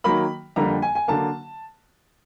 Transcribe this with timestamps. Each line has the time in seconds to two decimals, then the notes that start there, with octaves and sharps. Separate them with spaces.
0.04 D#3 F#3 A#3 B5
0.56 F2 D3 G3 A#3 A#5
0.82 G#5
0.95 G#5
1.08 D3 F#3 A#3 A5